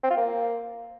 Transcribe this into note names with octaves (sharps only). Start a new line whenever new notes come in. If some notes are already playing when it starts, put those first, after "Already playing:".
C4
F4
A#3